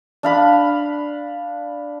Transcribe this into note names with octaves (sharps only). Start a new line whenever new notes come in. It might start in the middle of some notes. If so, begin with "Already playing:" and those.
D4 F5 B5